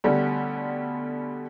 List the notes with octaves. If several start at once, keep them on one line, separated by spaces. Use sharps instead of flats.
B2 D3 G3 A3 C#4